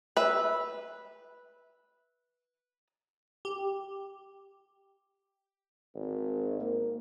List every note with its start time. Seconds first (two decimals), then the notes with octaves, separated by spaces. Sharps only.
0.17 B4 E5
3.45 G4
5.95 G#1
6.60 A#3